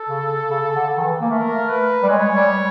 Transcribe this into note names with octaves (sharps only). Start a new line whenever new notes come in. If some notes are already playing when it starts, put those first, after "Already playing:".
Already playing: A4
C#3
C#3
D3
D#3
E3
A#3
A3 A#4
B4
G3
G#3 C#5
G3